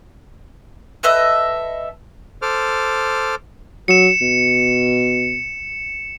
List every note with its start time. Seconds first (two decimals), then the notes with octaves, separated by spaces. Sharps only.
1.03 A4 B4 D#5 E5
2.42 A4 C5 D6 F6
3.88 F#3 C#7 E7
4.21 B2